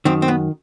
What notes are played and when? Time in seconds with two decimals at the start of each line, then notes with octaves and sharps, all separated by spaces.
0.05 F#2 D#3 C4
0.22 C4
0.28 B3